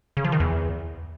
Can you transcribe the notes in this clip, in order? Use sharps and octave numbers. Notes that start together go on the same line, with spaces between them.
C#3
F3
D#3
E2